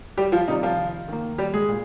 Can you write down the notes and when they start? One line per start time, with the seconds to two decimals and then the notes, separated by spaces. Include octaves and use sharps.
0.18 G3 G4
0.32 F3 F4
0.48 C3 D#3 G3 D#4
0.63 F3 F4
1.08 D#3 A#3
1.38 G3 G4
1.54 G#3 G#4
1.68 A#2